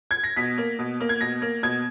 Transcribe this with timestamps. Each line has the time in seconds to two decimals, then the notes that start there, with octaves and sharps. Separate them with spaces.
0.11 G#6
0.24 A#6
0.37 B2 B6
0.58 A#3
0.79 B2
1.00 A#3
1.09 G#6
1.21 B2 A#6
1.42 A#3
1.63 B2 G#6